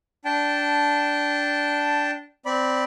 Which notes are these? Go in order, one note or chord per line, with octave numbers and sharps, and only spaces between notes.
D4 G5 A5
C4 D5 B5